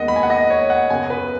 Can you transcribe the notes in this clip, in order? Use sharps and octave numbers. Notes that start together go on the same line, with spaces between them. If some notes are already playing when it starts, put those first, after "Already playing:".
Already playing: D#2 D#3 G#3 B3 D#5 F#5
B5
G#5
F#5
D#5
C#5
F#5
F#2 C#3 B3 G#5
B4